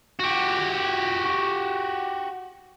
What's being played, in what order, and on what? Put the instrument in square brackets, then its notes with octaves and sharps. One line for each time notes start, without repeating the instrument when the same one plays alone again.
[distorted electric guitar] F#4 G4